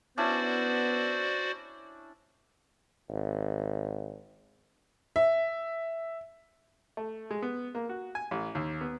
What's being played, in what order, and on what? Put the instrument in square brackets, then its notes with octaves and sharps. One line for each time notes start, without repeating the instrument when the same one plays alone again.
[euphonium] B3 [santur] C#4 D4 E4 [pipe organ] F#4 C5 D5
[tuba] G#1
[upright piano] E5
[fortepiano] A3
G#3
B3
A#3
F#4
G#5
A1
D#2
B3